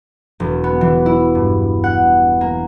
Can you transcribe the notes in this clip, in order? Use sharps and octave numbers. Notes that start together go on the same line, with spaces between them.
E1
B3
E3
E4
G2
F#5
A#3